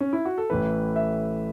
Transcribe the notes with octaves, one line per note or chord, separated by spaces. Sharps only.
C#4
E4
F#4
A4
A1 A2 E3 A3 B4
E5